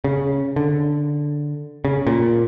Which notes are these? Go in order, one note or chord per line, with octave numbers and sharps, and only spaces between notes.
C#3
D3
C#3
A#2